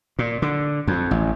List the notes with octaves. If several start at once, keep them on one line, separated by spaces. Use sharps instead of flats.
A#2
D3
F2
A1